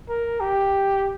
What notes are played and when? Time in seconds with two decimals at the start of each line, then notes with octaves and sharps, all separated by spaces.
0.09 A#4
0.41 G4